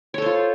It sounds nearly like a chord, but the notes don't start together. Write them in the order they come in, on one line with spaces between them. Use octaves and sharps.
C#5 A4 C5 F4